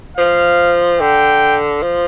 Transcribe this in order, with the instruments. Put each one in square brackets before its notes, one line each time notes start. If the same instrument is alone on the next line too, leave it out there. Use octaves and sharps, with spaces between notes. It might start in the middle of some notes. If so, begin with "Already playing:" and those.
[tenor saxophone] F3 [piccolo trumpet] F5
[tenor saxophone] D3 [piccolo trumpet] G5
[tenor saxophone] F3